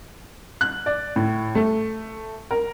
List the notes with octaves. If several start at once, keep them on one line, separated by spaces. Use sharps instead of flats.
F#6
D5
A2
A3
A#4